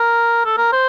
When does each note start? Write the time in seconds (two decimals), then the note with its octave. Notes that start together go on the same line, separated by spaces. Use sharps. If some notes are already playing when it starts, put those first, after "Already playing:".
Already playing: A#4
0.46 A4
0.57 A#4
0.72 C5